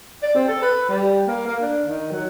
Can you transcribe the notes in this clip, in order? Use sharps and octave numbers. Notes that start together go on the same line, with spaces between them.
D5
C4
A4
B4
G3
A#3
A#3
D4
D#3
F#3